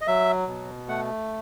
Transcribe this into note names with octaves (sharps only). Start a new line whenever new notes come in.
D#5
F#3 E5
B2
A3 F#5